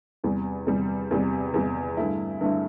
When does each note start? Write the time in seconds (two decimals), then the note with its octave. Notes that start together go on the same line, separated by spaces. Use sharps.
0.24 E2 C3 G3
0.67 E2 C3 G3
1.11 E2 C3 G3
1.54 E2 C3 G3
1.97 G2 D3 A3 E4
2.41 G2 D3 A3 E4